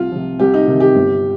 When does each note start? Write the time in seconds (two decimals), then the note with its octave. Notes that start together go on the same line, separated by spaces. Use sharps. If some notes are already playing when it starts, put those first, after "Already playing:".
Already playing: C2 F4
0.12 C3 F3
0.39 C2 G4
0.54 D#4
0.67 C3 D#3
0.80 G4
0.95 G1